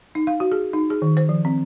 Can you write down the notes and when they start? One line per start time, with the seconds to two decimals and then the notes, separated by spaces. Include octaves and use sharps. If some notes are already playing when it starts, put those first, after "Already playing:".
0.15 D#4
0.27 F5
0.40 F#4
0.52 G#4
0.73 D#4
0.90 G#4
1.02 D#3
1.17 C5
1.29 F3
1.45 C4